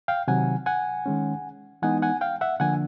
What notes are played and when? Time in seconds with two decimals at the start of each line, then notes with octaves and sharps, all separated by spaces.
0.08 F5 G5
0.28 C3 D#3 F#3 F#5 G#5
0.66 F#5 G#5
1.06 D#3 G#3 C#4
1.82 E3 G#3 B3 D#4 F#5 G#5
2.02 F#5 G#5
2.21 F5 G5
2.41 E5 F#5
2.60 D3 F3 A#3 D4 F#5 G#5